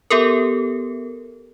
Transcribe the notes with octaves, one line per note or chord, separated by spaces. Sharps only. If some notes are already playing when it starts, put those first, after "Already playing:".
B3 G4 A4 A#4